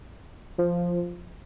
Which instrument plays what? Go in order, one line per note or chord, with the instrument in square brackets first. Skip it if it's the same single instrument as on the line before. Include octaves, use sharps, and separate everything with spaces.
[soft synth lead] F3